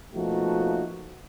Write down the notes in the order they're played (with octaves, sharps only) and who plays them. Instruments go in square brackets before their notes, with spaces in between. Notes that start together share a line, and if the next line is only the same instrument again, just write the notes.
[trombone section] B2 F3 A3 A#3 D#4 F#4